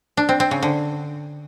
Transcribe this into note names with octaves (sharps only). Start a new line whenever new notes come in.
D4
C4
C4
C#3
D3